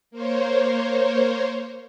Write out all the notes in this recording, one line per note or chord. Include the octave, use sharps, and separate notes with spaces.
A#3 C5 C#5